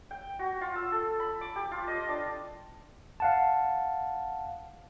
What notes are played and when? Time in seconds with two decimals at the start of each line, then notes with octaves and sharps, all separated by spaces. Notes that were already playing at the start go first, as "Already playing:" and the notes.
0.11 G5
0.39 F#4
0.61 F4
0.76 E6
0.92 A4
1.20 B5
1.41 D6
1.56 G4
1.71 F4
1.88 D#5
2.08 D4
3.20 F5 F#5 A5